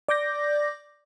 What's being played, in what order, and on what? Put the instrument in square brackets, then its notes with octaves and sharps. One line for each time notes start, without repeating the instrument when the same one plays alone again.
[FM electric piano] D5 D6 G6 A#6